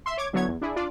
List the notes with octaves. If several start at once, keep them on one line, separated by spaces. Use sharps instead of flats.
E5 C6
C#5 D6 G#6
D3 F#3 B3 E4 C#5 G#6
E2
D4 E4 G#4
D4 F4 D5